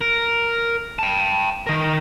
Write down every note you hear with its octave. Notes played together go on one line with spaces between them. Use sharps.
A#4
G5 A5
D#3 A#4